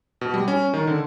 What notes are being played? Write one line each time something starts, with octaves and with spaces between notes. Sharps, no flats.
B2
G3
C#4
D#3
D3